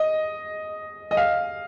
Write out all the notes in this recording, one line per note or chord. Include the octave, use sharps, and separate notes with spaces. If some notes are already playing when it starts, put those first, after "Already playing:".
Already playing: D#5
D#5
F5